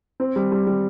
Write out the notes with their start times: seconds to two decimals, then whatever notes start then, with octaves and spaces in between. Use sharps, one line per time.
0.20 C4
0.36 G3
0.52 G3
0.67 G3